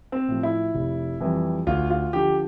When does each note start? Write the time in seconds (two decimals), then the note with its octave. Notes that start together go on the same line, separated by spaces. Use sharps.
0.12 C4
0.28 A2 F3
0.43 E4
0.75 F1
1.21 F2 E3 G3
1.67 D2 F4
1.91 F4
2.13 D3 F3 G4